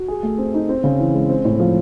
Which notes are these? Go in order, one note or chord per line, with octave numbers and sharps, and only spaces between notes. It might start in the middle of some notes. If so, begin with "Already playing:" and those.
Already playing: F#4
G#4
A3
C4
D#4
C4
C#3
E3
G#3
C4
A2
F3